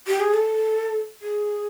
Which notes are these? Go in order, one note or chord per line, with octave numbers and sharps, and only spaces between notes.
G4
G#4
A4
G#4